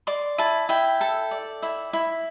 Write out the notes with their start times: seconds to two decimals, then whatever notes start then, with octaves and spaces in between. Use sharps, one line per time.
0.07 D5 C6
0.38 E4 A5
0.69 E4 G5
1.01 A4
1.31 D5
1.62 E4
1.93 E4